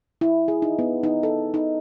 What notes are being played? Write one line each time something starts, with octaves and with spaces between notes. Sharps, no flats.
E4
G#4
D#4
B3
D#4
A4
D#4